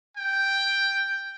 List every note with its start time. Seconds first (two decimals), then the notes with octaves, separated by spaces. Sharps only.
0.17 G5